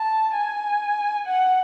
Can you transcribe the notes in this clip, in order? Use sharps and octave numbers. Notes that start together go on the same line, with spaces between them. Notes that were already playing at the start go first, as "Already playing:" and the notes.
Already playing: A5
G#5
F#5